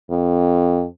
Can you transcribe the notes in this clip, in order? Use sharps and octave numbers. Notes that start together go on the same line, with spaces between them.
F2